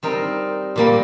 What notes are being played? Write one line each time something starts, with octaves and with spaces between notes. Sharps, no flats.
G3 C4 D#4 A#4
A#2 G3 A#3